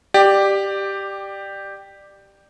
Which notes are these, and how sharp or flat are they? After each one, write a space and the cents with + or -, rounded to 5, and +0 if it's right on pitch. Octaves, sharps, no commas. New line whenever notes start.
G4 +0 D5 +20